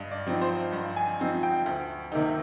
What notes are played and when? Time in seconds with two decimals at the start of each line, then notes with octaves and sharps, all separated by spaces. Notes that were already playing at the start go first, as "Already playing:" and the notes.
Already playing: G2 D#5
0.11 D5
0.27 F3 C4 D#4
0.42 C5
0.72 G2
0.96 G#5
1.19 F3 C4 D#4
1.43 G5
1.66 D2
2.12 C3 D#3 A#3 D#4